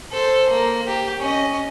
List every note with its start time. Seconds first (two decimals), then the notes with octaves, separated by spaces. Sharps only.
0.12 A4 C5
0.49 A#3
0.87 G4
1.19 C#4 D#5